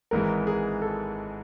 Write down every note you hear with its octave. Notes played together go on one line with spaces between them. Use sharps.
G#1 G#2 E3 G#3 A#4
G#4
A4